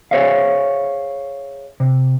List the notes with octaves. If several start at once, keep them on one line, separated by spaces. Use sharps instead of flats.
G#4 C5 C#5 E5 F5
C3